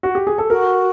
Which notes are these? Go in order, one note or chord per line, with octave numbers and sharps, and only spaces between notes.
F#4
G4
G#4
A4
F#4 A#4